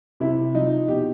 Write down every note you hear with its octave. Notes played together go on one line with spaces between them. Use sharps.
C3 E4
F3 D#4
B2 G4